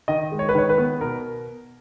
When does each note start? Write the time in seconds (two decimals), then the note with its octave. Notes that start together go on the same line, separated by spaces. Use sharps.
0.08 D#3 D#5
0.32 G#3
0.39 C#5
0.49 B4
0.55 D#3 C#5
0.69 B4
0.78 B3
1.01 B2 A#4